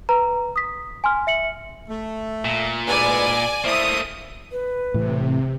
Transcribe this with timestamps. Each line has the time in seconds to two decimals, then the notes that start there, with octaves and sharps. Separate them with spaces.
0.09 B4 A#5
0.56 D#6 B6
1.04 G#5 C6 F6
1.27 E5 C#7 F#7
1.89 A3
2.45 A#2
2.87 D2 G#2 B4 D5 G#5
3.64 A3 A#3 E4 C5 D#6
4.52 B4
4.94 A2 C3 E3